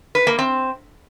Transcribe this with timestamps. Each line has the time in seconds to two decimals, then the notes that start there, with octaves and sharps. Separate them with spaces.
0.15 B4
0.27 A#3
0.39 C4